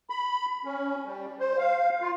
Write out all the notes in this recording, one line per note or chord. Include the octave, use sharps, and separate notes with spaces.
B5
C#4
G3
C5
F5
F4